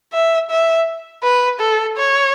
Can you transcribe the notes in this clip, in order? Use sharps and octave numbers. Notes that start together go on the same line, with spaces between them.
E5
E5
B4
A4
C#5